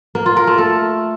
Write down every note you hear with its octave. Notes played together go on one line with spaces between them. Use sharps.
A#3
F4
A#4
A3
A4